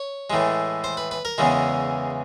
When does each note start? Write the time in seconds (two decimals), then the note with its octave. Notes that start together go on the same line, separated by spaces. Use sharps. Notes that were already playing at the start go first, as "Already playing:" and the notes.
Already playing: C#5
0.30 A2 E3 G#3
0.84 C5
0.97 B4
1.11 B4
1.25 A#4
1.38 E2 C#3 E3 G#3